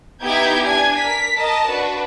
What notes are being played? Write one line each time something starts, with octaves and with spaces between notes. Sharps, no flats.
B3 D#4 E4 G4 G6 G#6
D4 G#5 G#6
A#4 B6
A#4 D#5 A5
D4 F#4 B4